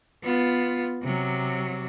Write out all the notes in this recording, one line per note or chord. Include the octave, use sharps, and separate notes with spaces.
B3 F4
C3 F#3